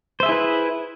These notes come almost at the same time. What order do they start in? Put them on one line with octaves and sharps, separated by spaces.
C5 E5 G#4 E4 B4